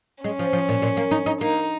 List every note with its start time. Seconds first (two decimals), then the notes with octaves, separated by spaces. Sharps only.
0.24 G#3 C#4
0.39 F3
0.53 F3
0.69 A#2
0.82 A#2
0.97 A#3
1.11 D#4
1.26 D#4
1.41 A#3 D#4